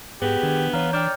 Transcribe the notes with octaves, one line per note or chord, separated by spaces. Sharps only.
G#2 B3 G4 G#4
D#3 D4
E3 C#5 F5 A#5
D4 D5 G5 F6 G6